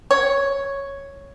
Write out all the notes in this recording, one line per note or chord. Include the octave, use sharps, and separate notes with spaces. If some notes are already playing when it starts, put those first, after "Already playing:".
C#5